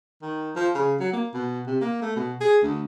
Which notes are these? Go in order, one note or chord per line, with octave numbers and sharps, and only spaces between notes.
D#3
F3
C#3
F#3
A#3
B2
C3
A#3
A3
B2
G#4
D2